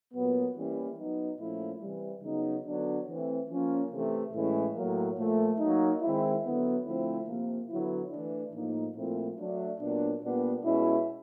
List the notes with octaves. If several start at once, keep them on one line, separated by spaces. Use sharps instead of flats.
A#2 F#3 B3
E3 G3 A#3 C#4 E4
F#3 B3 D#4
A#2 F3 A3 C#4 E4
C3 E3 G3
C#3 F#3 B3 D#4
D3 F#3 B3 D4
E3 A3 C4
F3 A#3 C#4
C3 E3 A3
A2 E3 G#3 C#4 E4
A2 F#3 A#3
A#2 F3 A3
F#3 A#3 D#4
D#3 G#3 C4 E4
D3 F#3 B3 E4
D3 F3 A3 C4 E4
C3 F3 A#3
D3 F#3 B3 E4
E3 A3 D4
A2 F3 A#3 D#4
A#2 F3 A3 C4 E4
F#3 A3 D4
A#2 F#3 B3 D4
A#2 G3 B3 D4
B2 G#3 C#4 E4